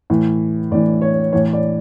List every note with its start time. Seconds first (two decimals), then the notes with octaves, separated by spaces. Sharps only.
0.10 A2 E3
0.71 A2 E3 D5
1.02 C#5
1.33 A2 E3 C#5
1.53 D5